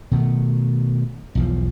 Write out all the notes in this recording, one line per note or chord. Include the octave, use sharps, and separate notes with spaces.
B2 D#3 A3
B1 E2 F3